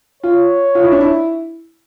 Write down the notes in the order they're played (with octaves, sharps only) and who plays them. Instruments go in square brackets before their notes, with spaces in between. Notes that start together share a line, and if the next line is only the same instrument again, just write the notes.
[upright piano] F4 [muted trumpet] C#5
[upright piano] F4
E4
D4
E4